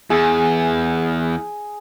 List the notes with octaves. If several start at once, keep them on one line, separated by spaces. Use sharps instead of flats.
E2 G#4